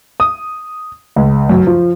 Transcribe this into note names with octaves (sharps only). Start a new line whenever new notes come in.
D#6
C#2
F#2
F3